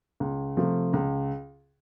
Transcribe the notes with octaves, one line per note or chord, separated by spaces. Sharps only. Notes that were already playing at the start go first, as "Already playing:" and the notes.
C#2
C3 F3 A3
C#2